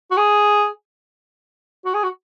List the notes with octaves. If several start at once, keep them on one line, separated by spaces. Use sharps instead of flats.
F#4
G#4
F#4
G#4
F#4